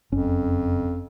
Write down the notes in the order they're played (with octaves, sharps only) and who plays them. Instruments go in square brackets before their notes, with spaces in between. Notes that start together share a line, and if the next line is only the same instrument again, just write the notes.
[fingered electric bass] F#1 C#4 [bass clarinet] F2